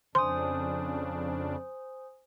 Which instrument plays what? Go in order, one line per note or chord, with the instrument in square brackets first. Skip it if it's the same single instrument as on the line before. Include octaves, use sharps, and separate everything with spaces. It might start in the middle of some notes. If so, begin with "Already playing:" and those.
[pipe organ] F2 C#3 D4 [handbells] C5 G#5 D#6 [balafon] C6